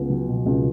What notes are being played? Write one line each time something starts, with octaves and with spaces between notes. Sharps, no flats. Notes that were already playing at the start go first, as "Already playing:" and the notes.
Already playing: C#2 B3
F#3
B2
C#2